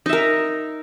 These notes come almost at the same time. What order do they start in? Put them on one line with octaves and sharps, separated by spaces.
D#4 E5 A#4